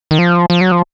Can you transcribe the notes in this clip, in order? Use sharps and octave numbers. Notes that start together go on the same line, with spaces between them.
D#3
F3
F3
F#3
F3